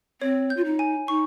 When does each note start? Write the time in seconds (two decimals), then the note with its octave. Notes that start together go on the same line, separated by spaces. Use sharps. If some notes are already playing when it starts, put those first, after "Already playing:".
0.21 C4 C#5
0.50 G6
0.56 F4
0.64 D#4
0.79 G#5
1.08 D#4 C#6